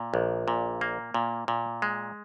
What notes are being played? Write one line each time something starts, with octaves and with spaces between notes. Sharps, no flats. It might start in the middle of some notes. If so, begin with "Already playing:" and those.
Already playing: A#2
A#1
A#2
A#3
A#2
A#2
G#3